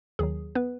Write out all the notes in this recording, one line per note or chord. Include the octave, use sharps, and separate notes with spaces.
D#2 D#3 F#3 G#4
B3 B4